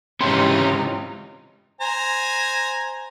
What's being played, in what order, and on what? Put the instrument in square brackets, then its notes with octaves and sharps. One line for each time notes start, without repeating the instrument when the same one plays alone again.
[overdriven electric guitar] C#2 C3 [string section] G#2 E3 D#4 [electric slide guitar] C#4 G4 [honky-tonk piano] C6
[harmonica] C5 G#5 A#5